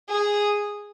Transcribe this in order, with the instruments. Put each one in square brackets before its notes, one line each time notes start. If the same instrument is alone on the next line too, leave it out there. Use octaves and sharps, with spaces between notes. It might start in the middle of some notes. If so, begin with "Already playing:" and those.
[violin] G#4